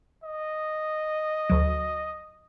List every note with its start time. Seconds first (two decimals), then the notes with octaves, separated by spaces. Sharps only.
0.24 D#5
1.50 D2 F#3